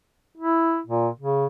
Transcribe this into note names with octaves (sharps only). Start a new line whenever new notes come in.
E4
A#2
C#3